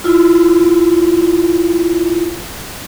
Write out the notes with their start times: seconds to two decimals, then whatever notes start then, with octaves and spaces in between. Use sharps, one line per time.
0.04 E4 F4